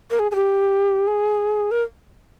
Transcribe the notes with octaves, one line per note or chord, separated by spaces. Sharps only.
A#4
G#4
G#4
G4
G#4
A#4